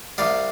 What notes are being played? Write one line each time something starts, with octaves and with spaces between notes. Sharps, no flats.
C2 C3 G3 D5 F5